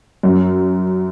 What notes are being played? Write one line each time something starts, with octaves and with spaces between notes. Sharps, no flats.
F#2